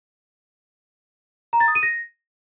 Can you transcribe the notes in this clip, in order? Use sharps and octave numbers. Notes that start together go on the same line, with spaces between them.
A#5
A6
D#6
D#7
A#6